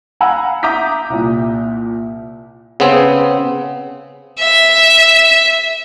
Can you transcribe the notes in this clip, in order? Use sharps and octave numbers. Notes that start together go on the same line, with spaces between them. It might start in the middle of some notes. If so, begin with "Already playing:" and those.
F5 F#5 G#5 A#5 B5 E6
E5 A#5 D6 D#6 G6 B6
C2 A#2
C#3 B3 C4
E5